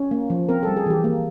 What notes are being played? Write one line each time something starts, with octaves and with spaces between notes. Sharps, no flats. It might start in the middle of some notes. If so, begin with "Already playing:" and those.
Already playing: C#4
A#3
F3
C4 A#4
A4
G3
G#4
E3 G4
A#3